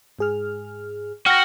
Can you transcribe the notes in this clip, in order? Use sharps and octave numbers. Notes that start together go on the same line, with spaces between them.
G#2 G#4 F6
F#4 F#5 G5 F6 A#6